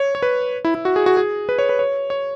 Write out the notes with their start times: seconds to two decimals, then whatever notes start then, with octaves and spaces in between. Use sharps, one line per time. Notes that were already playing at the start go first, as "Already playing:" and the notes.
Already playing: C#5
0.15 C#5
0.22 B4
0.65 E4
0.75 E4
0.85 F#4
0.96 G#4
1.06 F#4
1.17 G#4
1.49 B4
1.59 C#5
1.69 B4
1.79 C#5
2.10 C#5